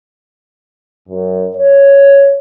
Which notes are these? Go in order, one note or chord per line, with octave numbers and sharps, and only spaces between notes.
F#2
C#5